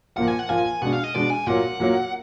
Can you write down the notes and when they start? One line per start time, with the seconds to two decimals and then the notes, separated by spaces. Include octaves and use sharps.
0.16 A#2 F3 A#3 F4 F#5
0.28 G#5
0.39 F#5
0.49 A#2 F3 A#3 F4 G#5
0.82 B2 G#3 D4 F#5
0.93 F5
1.04 D#5
1.14 B2 G#3 D4 D5
1.30 G#5
1.46 A#2 F#3 A#3 F#5
1.80 A#2 F#3 A#3